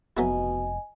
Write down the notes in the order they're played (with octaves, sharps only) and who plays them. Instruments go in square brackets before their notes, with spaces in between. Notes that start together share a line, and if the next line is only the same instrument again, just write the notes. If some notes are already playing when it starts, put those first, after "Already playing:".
[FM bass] F1 [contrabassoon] B2 [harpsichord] F#3 B3 E4 [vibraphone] D#5 G#5